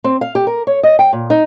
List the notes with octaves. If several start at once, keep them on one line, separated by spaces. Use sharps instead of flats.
C4
F5
G4
A#4
C#5
D#5
G5
A#2
D#4